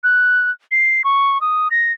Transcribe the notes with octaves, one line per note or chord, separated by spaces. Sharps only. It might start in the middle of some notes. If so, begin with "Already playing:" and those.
F#6
C7
C#6
D#6
A#6